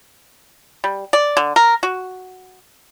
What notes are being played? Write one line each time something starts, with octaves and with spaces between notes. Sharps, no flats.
G3
D5
D3
A#4
F#4